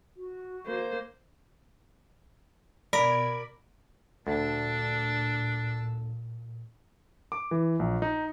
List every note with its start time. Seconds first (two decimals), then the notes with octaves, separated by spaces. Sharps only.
0.17 F#4
0.66 A#3 C5
2.93 B2 A#4 D5 B5 G#6
4.27 D2 A#2 D4 A5 E6
7.32 D6
7.51 E3
7.79 A#1
8.02 D#4